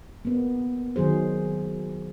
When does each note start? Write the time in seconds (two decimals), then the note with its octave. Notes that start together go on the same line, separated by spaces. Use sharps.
0.25 A#3 B3
0.96 D#3 F#3 G#4 C5